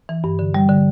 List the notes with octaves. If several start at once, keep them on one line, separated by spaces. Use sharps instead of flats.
E3
G2
D3
G3
D3